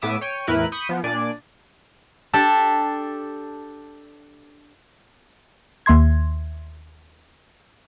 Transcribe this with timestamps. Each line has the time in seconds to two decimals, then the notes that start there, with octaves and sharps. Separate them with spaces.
0.01 A2 B3 E5 D6 D#6 E7
0.21 C#5 G5 C#7 D#7
0.47 E2 A2 E4 A#4 B4 F#6
0.72 B5 C#6 D#6 G6
0.89 F3 B3
1.04 A#2 D4 D5 G#5
2.33 D4 G4 A4
5.86 D#2 E5 C6 G#6